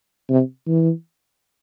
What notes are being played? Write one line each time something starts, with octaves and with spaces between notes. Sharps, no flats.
C3
E3